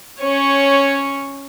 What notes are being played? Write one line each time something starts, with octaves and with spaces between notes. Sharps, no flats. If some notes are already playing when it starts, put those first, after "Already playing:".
C#4 C#5